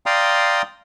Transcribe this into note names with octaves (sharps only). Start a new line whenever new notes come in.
D5 F5 G5 A#5 C6 D#6